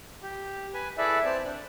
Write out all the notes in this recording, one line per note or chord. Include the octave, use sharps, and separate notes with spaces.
G4
B4 G#5
E4 G#4 A4 B4 D5 E5
C4 D5 A5
D4